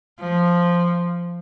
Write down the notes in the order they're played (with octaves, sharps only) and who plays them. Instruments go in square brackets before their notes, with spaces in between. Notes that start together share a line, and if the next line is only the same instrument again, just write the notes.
[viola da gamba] F3